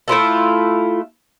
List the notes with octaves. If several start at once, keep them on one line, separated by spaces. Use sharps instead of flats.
A3 E4 F4 A4